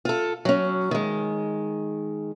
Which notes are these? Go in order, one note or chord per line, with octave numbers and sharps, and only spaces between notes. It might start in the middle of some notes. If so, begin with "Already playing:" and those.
F4 A4
F#3 C#4
D#3 G#3